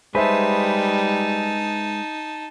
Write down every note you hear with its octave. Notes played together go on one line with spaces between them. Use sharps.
G3 G#3 D#4 G#4 B4 C5 E5 A5